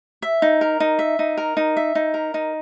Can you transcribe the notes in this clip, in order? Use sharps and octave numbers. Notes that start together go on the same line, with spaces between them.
E5
D#4
A#4
D#4
E5
D#4
A#4
D#4
E5
D#4
A#4
D#4